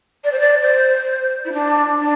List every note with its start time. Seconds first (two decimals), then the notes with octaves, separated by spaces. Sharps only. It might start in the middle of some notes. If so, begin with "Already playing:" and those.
0.24 D5
0.32 C5
0.40 D5
0.62 C5
1.45 E4
1.53 D4
1.98 D4